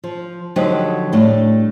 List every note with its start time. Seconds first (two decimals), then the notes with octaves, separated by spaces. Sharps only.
0.04 F3
0.56 D3 F3 F#3 D#4 G4 D#5
1.12 A2 G3 A3 D4